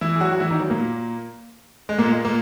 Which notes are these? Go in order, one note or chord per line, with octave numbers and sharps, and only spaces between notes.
E3 E4
G#4
F#3 F#4
F#4
E3 E4
D#3 D#4
F#3
A#2 A#3
G#3
A#2 A#3
G#3
A#2 A#3